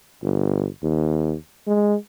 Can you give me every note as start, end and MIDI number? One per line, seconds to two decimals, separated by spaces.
0.23 0.68 31
0.83 1.36 39
1.68 1.95 56